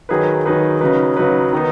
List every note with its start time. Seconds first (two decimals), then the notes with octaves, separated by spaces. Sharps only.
0.09 D#3 F#3 D#4 G#4 B4
0.45 D#3 F#3 D#4 G#4 B4
0.81 C#3 F#3 D#4 B4
1.17 C#3 F#3 D#4 B4
1.53 D#3 B3 D#4